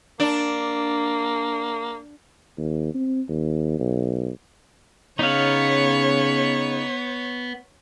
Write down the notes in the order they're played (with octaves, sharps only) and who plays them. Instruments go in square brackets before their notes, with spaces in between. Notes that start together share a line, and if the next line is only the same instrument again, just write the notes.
[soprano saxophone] A#3 [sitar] D4
[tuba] D#2
C4
D#2
B1
[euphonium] C#3 [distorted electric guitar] B3 [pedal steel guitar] D#4 F5 [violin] C#5